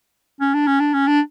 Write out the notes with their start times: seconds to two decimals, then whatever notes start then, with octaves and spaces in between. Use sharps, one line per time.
0.41 C#4
0.54 D4
0.67 C#4
0.80 D4
0.94 C#4
1.07 D4